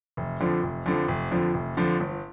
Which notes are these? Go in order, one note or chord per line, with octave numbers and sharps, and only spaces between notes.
F1
F2 D3 F3
F1
F2 D3 F3
F1
F2 D3 F3
F1
F2 D3 F3
G1